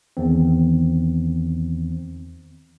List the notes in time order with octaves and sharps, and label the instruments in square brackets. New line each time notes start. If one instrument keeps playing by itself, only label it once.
[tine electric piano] E2 D#3 C4